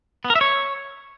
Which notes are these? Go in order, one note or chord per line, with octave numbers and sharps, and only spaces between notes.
B3
A#4
E5
C#5